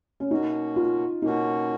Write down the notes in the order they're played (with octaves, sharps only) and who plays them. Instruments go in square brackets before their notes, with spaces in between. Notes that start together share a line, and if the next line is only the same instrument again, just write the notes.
[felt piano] C#4
[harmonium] B2 A#3 C#4 F#4 [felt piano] D#4
[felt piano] F4
[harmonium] B2 A#3 C#4 F#4 [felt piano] D#4